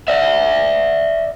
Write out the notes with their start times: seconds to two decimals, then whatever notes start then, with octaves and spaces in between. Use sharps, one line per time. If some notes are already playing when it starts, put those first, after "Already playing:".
0.08 D5 E5